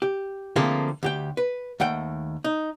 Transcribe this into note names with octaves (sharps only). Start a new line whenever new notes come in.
G4
D3 F3 A3 A#3 C4 G#4
D2 G4 G5
B4
D#2 A3 F#5 G5
D#4